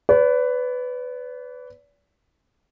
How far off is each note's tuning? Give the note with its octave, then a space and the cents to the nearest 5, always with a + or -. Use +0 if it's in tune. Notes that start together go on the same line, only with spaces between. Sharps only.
B4 +15 D5 -40